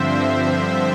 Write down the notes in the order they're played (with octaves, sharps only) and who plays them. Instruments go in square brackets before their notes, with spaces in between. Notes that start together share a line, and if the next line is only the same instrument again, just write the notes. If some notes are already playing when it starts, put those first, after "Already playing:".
Already playing: [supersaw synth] G2 D3 F3 C4 C5 E5